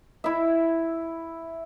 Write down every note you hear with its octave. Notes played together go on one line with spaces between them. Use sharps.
E4 E5